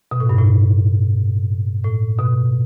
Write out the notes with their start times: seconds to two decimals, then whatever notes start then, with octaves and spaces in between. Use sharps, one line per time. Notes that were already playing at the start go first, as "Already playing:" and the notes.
0.11 B2
0.20 A2
0.29 G2
0.38 A2
1.84 A2
2.18 B2